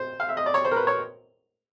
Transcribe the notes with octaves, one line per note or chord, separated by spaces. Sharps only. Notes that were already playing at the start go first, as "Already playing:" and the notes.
Already playing: C5
F5
E5
D#5
D5
C#5
C5
A#4
B4
C#5